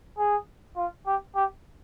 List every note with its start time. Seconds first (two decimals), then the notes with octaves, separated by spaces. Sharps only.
0.18 G#4
0.77 F4
1.07 G4
1.36 G4